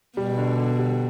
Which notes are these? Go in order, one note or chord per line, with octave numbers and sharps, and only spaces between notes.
B2 G3
D3
D3
G3